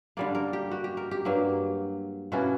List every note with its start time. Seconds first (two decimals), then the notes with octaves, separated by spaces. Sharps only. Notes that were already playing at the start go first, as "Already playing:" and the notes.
0.17 D3 G3 A#3 D5
0.35 A#4
0.53 G4
0.71 F#4
0.84 G4
0.97 A#4
1.11 G4
1.25 G2 F#3 A#3
2.32 B2 A#3 C#4 E4 F#4